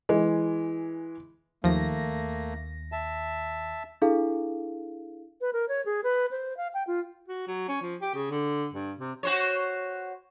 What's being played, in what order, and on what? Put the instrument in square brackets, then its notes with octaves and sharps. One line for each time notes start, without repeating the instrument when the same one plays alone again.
[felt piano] E3 G#3
[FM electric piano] D#2 A#6 [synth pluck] F3 [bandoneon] A3 A#3
[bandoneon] E5 A5
[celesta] D4 E4 G#4 A4 F5
[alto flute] B4
A#4
C#5
G#4
B4
C5
F5
G5
F4
[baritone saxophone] F#4
F#3
C#4
F3
G4
C#3
D3
G2
C3
[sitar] F#4 C5 C#5